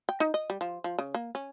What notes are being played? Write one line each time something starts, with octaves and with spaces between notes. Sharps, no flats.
G5
D#4
D#5
G3
F3
F3
C#3
A#3
C#4